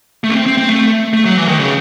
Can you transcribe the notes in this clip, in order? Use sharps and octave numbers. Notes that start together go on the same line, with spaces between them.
A3
C#4
C4
C4
C4
A3
A3
F#3
E3
D#3
C#3